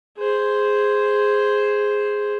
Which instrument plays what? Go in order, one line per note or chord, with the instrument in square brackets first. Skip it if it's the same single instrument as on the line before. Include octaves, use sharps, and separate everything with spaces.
[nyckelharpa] G#4 C5